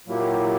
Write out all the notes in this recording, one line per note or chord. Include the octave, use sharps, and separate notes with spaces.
A#2 F#3 A#3 E4 G4